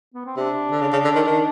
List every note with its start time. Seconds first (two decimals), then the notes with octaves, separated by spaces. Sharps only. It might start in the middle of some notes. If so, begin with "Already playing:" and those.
0.14 B3
0.25 C4
0.37 C3 D4
0.71 D3
0.81 C#3
0.93 C#3
1.04 D3
1.15 D#3
1.27 D#3